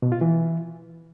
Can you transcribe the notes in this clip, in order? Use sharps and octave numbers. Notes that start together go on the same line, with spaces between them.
B2
F4
E3